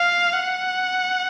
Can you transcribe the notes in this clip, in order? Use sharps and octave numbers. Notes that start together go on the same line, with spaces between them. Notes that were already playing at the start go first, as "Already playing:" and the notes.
Already playing: F5
F#5